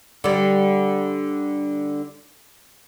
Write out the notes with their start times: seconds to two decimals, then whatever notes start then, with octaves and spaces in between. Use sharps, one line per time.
0.24 D3 G3